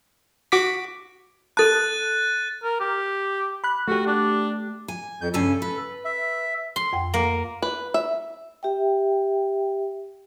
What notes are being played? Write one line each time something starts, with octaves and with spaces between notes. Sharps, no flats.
F#4 D6 B6
A4 A5 F#6 A6 D#7
A#4
G4
B5 F#6
A3 F#4 G4
D4
G#5
F2 G6
G2 C#3 A4 G#5
B4
E5
C6
F2 F#5 G5
A#3
B4
E5
G4 E5 G5